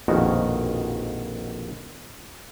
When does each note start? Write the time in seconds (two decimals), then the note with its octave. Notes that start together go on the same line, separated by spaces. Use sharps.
0.08 A#1 F2 B2 D#3 F#4 A#4